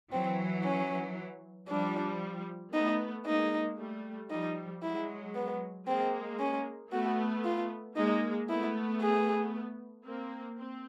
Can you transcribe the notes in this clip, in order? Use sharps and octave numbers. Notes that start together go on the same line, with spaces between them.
E3 F#3 C4
C#4
F3 G3 D4
A3 B3 D#4
G#3 A#3 D#4
G3 A3
F3 G3 D#4
F#3 G#3 E4
B3
G#3 A#3 C4
C#4
A3 B3 F#4
F4
G#3 A#3 D#4
A3 B3 E4
G#4
A#3 C4
C4